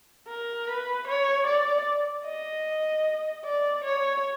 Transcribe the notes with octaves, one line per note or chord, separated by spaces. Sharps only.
A#4
B4
C#5
D5
D#5
D5
C#5